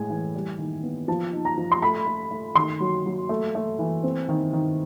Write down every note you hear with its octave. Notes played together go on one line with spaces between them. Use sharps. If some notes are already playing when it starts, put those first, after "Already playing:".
Already playing: A2 G#3 G#5
E3
G3
D#3
B3
F3 A5
D#4
A#5
F3
C6
A3 B5
A3
A3
D#3 C6
F#3
F#3
A3
A3
E3
C4
D#3
D#3